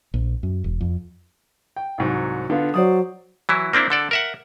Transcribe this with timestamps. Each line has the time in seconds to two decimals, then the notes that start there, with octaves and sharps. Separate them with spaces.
0.14 A#1
0.43 F#2
0.64 E1
0.81 F2
1.76 G5
1.98 C2 G#2 F#3
2.50 D3 B3 F4
2.74 F#3 C5 D5 D#6
3.49 E3 F#3 E4
3.73 A#3 C4 D4 E4
3.90 D3 A4 D5
4.11 A#4 E5 F#5